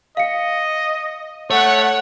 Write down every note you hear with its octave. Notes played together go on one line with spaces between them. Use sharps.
D#5 F5 C#7
A3 C#5 F#5